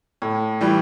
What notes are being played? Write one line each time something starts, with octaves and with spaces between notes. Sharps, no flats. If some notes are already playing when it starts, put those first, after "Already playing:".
A2
E3 G3